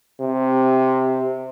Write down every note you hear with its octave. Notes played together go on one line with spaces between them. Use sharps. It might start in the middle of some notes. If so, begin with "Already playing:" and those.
C3